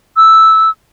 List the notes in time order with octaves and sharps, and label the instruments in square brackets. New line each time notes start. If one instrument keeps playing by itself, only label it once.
[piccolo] E6